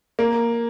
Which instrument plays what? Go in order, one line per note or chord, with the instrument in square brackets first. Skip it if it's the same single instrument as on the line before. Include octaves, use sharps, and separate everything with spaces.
[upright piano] A#3